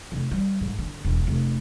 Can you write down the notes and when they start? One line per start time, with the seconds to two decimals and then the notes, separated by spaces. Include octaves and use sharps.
0.12 F1
0.31 G3
0.61 G#2
0.78 D3
1.05 E1
1.27 F1